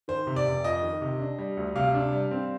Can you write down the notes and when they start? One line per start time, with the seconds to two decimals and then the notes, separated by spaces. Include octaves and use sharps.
0.08 D#3 C5
0.27 C3
0.36 D5
0.45 F1
0.64 F2 D#5
0.83 D#3
1.01 C3
1.20 D4
1.39 G3
1.57 D2
1.75 C3 F5
1.94 D4
2.12 G3
2.31 C4